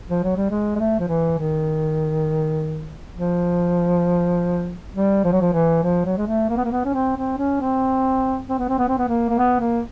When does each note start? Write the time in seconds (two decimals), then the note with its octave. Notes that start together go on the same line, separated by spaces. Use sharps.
0.09 F3
0.24 F#3
0.36 G3
0.51 G#3
0.76 G#3
0.79 A3
1.00 F3
1.09 E3
1.38 D#3
3.17 F3
4.94 G3
5.24 F3
5.32 F#3
5.41 F3
5.53 E3
5.83 F3
6.05 F#3
6.17 G#3
6.27 A3
6.50 A#3
6.57 B3
6.64 A#3
6.71 B3
6.85 C#4
6.94 C4
7.17 C4
7.38 C#4
7.61 C4
8.50 C4
8.59 B3
8.69 C4
8.79 B3
8.88 C4
8.98 B3
9.08 A#3
9.30 A#3
9.38 B3
9.60 A#3